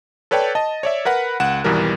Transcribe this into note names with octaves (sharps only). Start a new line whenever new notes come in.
A4 B4 C#5 D5 G5 A5
D#5 A5
C#5 D5 E5
A#4 B4 F#5 B5
C#2 F#5 F#6 E7
G#1 E2 B2 E3 G3 A#4